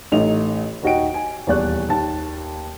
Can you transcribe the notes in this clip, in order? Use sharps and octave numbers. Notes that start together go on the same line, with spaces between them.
A1 A3 D#4 D#5 F7
D#2 D#4 F#4 D#5 G5 D7
G#5
D#1 E2 D5 C#6 F#6
D#2 A5